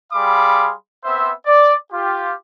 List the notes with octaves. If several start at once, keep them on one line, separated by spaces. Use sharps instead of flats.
G3 G#4 F5 B5 C6 D6
B3 C4 C5 E5
D5
F4 G4